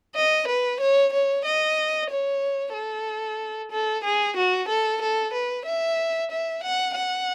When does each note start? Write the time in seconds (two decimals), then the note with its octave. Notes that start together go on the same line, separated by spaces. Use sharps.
0.16 D#5
0.48 B4
0.81 C#5
1.13 C#5
1.45 D#5
2.11 C#5
2.74 A4
3.72 A4
4.04 G#4
4.37 F#4
4.68 A4
5.02 A4
5.34 B4
5.66 E5
6.31 E5
6.63 F#5
6.95 F#5